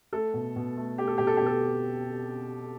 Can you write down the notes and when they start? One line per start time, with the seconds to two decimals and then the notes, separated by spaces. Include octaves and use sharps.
0.13 A3 A4
0.34 B2
0.56 B2
0.77 A3
0.98 A3 G4
1.08 A4
1.18 B2 G4
1.27 A4
1.37 B2 G4
1.46 A4